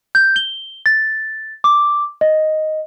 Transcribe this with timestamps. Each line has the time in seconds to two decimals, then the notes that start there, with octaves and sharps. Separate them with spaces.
0.15 G6
0.36 G7
0.86 A6
1.64 D6
2.21 D#5